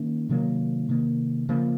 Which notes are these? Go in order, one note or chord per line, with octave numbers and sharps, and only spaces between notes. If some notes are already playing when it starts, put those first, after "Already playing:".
Already playing: D#3 A#3 C#4
C3 D#3 F#3 A#3
C3 D#3 A#3
C#3 F3 A#3